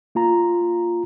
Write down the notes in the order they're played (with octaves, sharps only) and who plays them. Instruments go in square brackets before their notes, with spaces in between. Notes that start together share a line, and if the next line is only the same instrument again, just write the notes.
[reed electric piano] A#3 F4 A#5